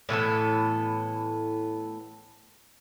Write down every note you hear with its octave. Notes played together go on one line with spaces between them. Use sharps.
A2 E3 B3 A4